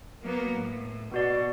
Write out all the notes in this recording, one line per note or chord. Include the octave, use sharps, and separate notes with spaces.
F#3 A#3 B3
A2
B2 B3 F#4 D5